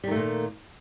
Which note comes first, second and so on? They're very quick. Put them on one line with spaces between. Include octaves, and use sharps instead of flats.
G3 D#3 A3 A#2 A#3